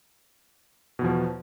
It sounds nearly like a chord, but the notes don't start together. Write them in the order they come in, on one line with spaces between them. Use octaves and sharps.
B2 E2 F3